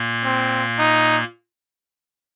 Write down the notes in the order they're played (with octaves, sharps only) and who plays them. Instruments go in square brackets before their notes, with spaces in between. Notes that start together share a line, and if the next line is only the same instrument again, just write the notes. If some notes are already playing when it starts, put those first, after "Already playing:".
Already playing: [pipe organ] A#2 A#3
[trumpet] C4
D#4